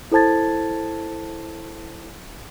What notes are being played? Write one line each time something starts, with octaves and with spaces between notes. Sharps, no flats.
E4 A4 C5 A5 G#6 A6